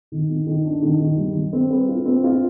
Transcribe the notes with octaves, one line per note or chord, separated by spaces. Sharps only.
D#3
D#3
D#3
D4
D#3
D#3
G3
G3
C4
B4
F4
C4
F4